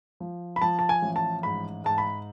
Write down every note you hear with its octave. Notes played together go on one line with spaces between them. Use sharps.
F3
B5
F3 A5
A5
G#5
A1
A5
G#2 B5
G#2 A5
B5